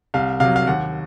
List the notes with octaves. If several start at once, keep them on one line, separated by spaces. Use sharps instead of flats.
C2 F5
C3 F#3 F5
F5
D#2 F#5